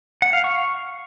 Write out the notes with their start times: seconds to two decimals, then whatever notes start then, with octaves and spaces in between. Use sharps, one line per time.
0.22 F#5
0.33 F5
0.44 C#6